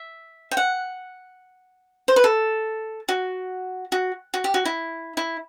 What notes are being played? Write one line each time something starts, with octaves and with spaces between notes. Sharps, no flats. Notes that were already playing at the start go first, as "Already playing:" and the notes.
Already playing: E5
G5
F#5
C5
B4
A4
F#4
F#4
F#4
G4
F#4
E4
E4